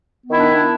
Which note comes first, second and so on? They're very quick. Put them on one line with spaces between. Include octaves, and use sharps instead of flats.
B3 D#3 E4 D4